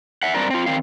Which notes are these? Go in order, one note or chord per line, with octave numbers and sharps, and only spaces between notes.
E5 F#5
G2 C4 D4 A#4
C4 F4
D#3 C4 F5